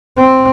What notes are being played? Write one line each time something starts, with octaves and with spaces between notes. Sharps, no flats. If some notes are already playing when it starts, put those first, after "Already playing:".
C4